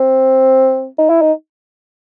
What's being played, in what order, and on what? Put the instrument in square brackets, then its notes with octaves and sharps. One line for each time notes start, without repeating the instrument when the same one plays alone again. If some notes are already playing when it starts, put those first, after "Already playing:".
Already playing: [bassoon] C4
D#4
E4
D#4